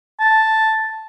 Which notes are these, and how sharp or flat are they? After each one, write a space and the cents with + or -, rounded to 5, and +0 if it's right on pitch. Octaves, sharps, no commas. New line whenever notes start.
A5 +0